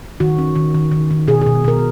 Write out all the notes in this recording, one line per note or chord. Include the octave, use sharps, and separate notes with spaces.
D#3 F#4
C#4
D#3
D#3
D#3
D#3
B2 G#4
B2 G#4
B2 A#4